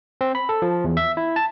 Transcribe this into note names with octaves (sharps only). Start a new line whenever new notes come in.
C4
B5
A4
F3
E2
E5
E4
A5